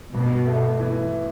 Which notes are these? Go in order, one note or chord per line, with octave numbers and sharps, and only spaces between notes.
G2 B2
A3
E3